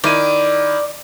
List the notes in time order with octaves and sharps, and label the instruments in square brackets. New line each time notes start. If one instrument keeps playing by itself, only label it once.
[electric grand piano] D#3 E4 D#7 [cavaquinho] D5